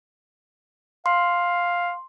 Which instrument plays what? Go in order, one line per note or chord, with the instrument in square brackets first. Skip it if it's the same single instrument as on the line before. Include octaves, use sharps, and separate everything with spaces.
[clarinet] F5 [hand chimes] C6